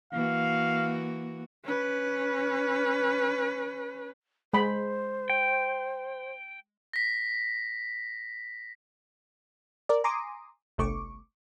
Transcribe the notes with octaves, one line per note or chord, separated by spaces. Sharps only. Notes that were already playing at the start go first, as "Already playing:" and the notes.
E3 A#3 F#4 F5
C#4 B4
G#3 C5 B5
G5
A#6 B6
A#4 D5
G#5 A#5 C6 D6 D#6
G1 C2 A3 C#6 D6